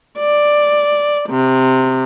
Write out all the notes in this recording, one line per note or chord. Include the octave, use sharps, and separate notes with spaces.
D5
C3